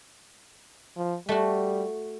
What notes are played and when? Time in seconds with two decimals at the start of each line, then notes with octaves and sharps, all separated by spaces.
0.97 F3
1.29 G3 A3 F#4